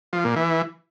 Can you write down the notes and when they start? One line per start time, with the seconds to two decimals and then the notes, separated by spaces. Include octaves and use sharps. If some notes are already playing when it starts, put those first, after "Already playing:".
0.13 F3
0.24 A#2
0.36 E3